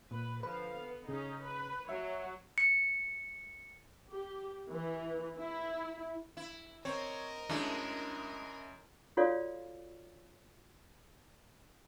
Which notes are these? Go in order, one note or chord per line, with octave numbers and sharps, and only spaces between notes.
A#2 B4
D3 F3 B4 F5
B3
C#3 C#4 D#4 G#4
B4
F#3 C#5 E5 F#5
C#7
G4
E3
E4
E4
C4 A#4 C#5 D#5
F#2 G#3 A3 D4 E4
F4 F#4 A4 C#5 D5 F5